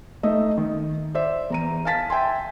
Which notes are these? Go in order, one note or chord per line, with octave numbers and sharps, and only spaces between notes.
A3 D#4 D#5 E5
D#3
C5 D5 E5
E2 A#5 D#7
F5 G#5 A5 A6 B6
E5 G5 G#5 C6